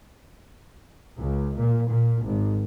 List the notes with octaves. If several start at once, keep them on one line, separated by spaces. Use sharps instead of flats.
C#2
A#2
A#2
G#1